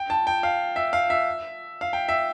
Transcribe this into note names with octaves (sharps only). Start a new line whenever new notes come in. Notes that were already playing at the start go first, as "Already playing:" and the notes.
Already playing: G5
A5
G5
F5
E5
F5
E5
F5
G5
E5